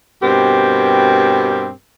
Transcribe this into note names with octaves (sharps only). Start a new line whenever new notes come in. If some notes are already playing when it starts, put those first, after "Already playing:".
G2 B2 C4 G4 A#4